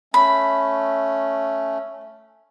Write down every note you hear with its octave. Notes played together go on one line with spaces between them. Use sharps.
A3 C#4 B5